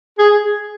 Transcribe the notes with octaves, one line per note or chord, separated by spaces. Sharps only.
G#4